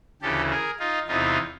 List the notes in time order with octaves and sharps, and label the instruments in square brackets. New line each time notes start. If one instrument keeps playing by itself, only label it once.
[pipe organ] D2 C#3 E3 G4 A4
G#4 A#4
D#4 F4
E2 C3 E3 D#4 F4